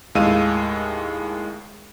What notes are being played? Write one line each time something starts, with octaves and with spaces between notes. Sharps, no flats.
D#2 A2 G#3 F5 E6 D#7